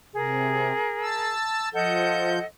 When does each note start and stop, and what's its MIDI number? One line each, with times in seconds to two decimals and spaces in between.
0.14 0.72 48
0.14 1.34 68
0.14 1.34 70
1.01 1.69 81
1.01 1.69 88
1.74 2.39 53
1.74 2.44 69
1.74 2.44 75
1.74 2.44 78
1.74 2.39 91